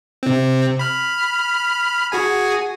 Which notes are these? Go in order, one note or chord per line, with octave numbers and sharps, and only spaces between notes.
C3 C4
B5 F6
F#4 G#4 G#5